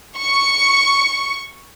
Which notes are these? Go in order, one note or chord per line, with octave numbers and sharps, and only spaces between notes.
C#6 C#7